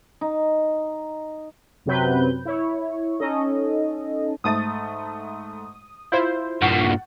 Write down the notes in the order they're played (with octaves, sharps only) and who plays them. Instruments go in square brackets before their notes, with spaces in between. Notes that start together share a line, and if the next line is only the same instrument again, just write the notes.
[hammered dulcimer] D#4
[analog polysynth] F#2 C3 F#3 C4 B4 G6
E4 C#5
C#4 D#4 A4 D#5
[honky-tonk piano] G#2 A3 A6 [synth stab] D#6
[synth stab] E4 F4 C5 [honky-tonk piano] G6
[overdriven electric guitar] G2 A#2 [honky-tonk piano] F#5 C#6